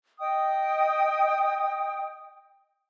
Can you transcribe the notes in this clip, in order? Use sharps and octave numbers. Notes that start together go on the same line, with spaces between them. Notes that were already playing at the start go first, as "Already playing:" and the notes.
D#5 G5 D#6